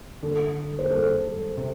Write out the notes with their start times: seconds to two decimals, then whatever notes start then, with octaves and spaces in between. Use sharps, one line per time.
0.23 D3 A4
0.79 C5
0.90 A4
1.57 C3